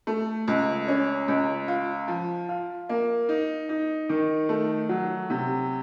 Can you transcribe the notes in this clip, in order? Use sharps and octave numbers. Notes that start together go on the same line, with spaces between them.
A3
C#2
C#4
C#2
F4
F3
F4
A#3
D#4
D#4
D#3
A3
F#3
C3